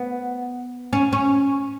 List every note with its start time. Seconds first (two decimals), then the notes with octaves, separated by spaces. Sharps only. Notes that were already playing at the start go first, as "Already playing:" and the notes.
Already playing: B3
0.93 C#4
1.13 C#4